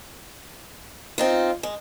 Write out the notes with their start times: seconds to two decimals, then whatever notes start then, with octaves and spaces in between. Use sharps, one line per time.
1.18 C4 D#4 F4
1.63 G#3